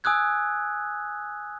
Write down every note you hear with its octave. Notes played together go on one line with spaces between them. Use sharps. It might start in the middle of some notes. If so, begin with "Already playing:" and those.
G#5 D#6 E6 F#6 G#6